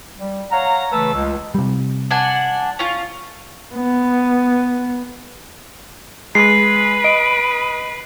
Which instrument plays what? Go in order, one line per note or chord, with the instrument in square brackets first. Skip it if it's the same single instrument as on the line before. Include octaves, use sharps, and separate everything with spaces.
[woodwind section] G3
C#5 F5 F#5 A#5
C#3 E3 A3 B4 A5 E6
C#2
[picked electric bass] C3 G3
[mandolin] D4 F#5 G#5
C#4 F4
[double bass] B3
[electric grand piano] G#3 [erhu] B4 [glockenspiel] C7
[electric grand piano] D#5 [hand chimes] D7